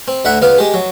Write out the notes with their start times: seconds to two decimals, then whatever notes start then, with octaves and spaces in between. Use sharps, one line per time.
0.08 C4
0.25 D2 D3 E5 F#5 B5
0.42 C#2 B3 F5
0.58 G#3 G4
0.74 F#3